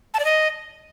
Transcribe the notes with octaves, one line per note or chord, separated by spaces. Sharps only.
A5
D5
D#5